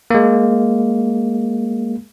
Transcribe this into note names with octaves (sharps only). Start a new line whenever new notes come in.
G#3 A#3